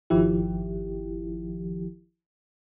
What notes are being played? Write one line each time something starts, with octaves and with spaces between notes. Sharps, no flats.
G1 D#3 F3 E4 G4